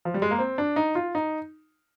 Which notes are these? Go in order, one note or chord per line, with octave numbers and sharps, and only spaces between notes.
F3
G3
G#3
A#3
C4
D4
D#4
F4
D#4